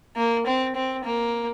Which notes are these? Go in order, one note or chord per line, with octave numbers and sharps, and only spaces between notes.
A#3
C4
C4
A#3